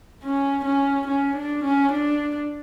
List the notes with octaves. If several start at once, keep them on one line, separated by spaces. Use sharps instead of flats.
C#4
C#4
C#4
D4
C#4
D4